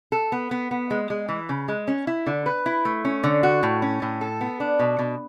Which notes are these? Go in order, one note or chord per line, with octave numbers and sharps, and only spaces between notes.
A4
B3
B3
B3
G#3
G#3
E3
C#3
G#3
C#4
E4
D3
B4
E4
A3
C#4
D3
F#4
A2
C#4
A2
A4
B3
D4
B2
B2